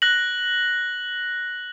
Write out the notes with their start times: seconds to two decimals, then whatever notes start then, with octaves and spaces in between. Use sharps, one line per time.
0.02 F#6 A#6 F#7